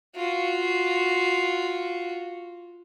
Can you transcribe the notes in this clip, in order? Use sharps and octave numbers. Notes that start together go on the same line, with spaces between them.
F4 F#4